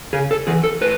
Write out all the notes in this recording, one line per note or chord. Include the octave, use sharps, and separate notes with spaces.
C#3 G#4
A4
E3 G#4
A4
A2 B4